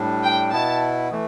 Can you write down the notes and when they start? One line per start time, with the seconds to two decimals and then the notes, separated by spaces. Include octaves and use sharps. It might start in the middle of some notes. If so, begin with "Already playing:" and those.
Already playing: A2 G3 D4
0.23 G5
0.51 B2 B3 E4 A5
1.12 E3 A3